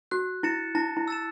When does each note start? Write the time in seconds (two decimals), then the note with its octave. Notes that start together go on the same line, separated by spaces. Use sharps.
0.11 F#4 F#6
0.43 E4 A6 C#7 E7
0.75 E4 A5
0.97 E4
1.08 E6 A6 E7